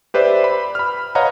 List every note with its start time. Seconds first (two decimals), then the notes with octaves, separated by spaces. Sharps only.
0.14 G4 B4 C5 D5 E5
0.44 B5
0.75 B5 F6
1.15 B4 C#5 D#5 F5 F#5 A#5